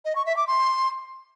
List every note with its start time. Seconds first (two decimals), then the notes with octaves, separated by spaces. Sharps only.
0.05 D#5
0.15 C#6
0.26 E5
0.37 D6
0.47 C6